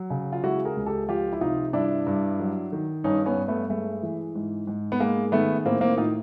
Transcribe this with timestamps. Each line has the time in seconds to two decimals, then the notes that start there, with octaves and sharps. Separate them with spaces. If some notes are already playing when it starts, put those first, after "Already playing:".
Already playing: F#3
0.10 C#3
0.33 F4
0.44 G#3 E4 F#4
0.65 G#4 A#4
0.76 C#2
0.86 G4 A4
1.08 F3 F4 G4
1.33 E4
1.41 C3 D#4 F4
1.73 G2 D4 E4
2.06 G2
2.40 F#3
2.72 D#3
3.04 G2 C#4 D#4
3.26 B3 C#4
3.37 G2
3.48 A3 B3
3.69 G#3 A3
4.03 E3
4.35 G#2
4.67 G#2
4.92 B3
5.00 G#3 A#3
5.32 D#3 A3 B3
5.65 A2 A#3 C4
5.81 A#3 C4
5.97 A2 D#4 F4